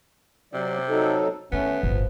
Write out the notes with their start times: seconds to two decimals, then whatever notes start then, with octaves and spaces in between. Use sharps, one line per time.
0.53 C3 F#3 D5
0.89 F#3 D#4 A4
1.52 D#3 A3 B3 C#4 E4
1.83 D1 G1 F3